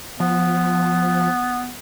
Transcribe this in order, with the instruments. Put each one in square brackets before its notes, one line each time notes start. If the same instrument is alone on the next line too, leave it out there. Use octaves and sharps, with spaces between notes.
[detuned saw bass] F3 [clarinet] B3